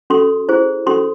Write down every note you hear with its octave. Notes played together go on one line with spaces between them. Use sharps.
C#4 F#4 A4 C6
E4 G#4 C5
C#4 F#4 A4 C6